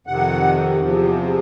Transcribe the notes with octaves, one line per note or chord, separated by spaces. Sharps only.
F2 C3 D#3 F#5
E2 C3 F3